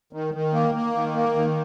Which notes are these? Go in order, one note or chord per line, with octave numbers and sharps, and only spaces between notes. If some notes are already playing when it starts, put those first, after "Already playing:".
D#3
D#3
A#3
A#3
D#3
A#3
D#3